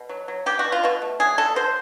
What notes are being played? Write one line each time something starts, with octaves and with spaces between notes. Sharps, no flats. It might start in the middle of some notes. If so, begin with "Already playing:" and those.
Already playing: B2
F#3
F#3
F#3 G4
F#4
B2
F4
B2 F#4
A3
F#3 G#4
F#3 A4
F#3 C5